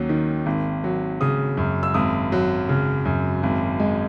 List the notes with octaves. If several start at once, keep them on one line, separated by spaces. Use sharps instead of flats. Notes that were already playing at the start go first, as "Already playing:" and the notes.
Already playing: D#2 F#3 C#4
D#3
G#1
F#3
C#3 D#6
F#2
E6
G#1 D#6
F#3
C#3
F#2
G#1
G#3